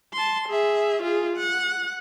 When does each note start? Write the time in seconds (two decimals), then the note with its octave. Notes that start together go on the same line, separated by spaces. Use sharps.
0.13 A5 C6
0.49 G#4 E5
1.02 F4 G#4
1.37 F#5